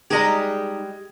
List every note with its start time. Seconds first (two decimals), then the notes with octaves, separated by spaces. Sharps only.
0.11 G3 G#3 D#4 G4 G#4 D#5 A5 A#5